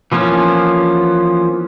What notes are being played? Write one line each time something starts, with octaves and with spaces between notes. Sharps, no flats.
E3 F3 A#3 B3 C#4